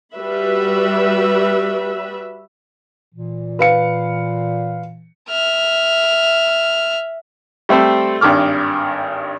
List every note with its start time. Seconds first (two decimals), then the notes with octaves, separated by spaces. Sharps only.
0.14 G3 F#4 B4 E5 B5
3.12 A#2 E3
3.59 B4 F5 C#7
5.29 E5 F6
7.69 G3 A3 C4 A4 C5
8.21 G#1 G2 D#3 D6 F6